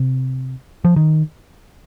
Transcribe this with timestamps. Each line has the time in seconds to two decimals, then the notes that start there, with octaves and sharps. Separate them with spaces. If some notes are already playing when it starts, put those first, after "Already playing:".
Already playing: C3
0.85 F3
0.96 D#3